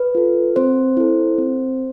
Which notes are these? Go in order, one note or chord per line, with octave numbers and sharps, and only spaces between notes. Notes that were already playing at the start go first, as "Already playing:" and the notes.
Already playing: B4
F4 A4
C4 C5
E4 A4
C4